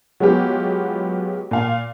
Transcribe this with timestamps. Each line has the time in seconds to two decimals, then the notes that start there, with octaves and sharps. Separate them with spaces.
0.20 F#3 G#3 B3 F4 G4
1.51 A#2 F5